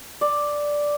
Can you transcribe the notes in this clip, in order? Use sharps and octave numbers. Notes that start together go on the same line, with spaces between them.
D5